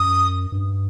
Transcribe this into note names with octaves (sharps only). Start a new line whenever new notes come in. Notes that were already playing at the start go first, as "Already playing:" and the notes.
Already playing: F#2 D#6
G2